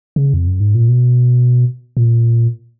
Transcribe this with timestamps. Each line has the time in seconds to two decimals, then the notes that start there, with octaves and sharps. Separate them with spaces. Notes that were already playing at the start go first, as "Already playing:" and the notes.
0.16 C#3
0.34 F2
0.47 F#2
0.60 G#2
0.75 A#2
0.89 B2
1.97 A#2